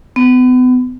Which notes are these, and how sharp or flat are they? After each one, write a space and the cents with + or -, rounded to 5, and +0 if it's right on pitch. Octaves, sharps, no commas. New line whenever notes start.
B3 +35